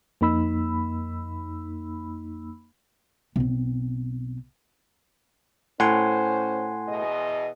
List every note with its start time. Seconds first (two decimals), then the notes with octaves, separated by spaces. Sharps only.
0.21 F2 A#3 D#4 B5 E6
3.36 B1 C4
5.80 A2 C#4 C5 F#5 G#5 C6
6.88 E2 B2 D#5